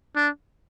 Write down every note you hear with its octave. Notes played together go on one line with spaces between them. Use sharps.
D4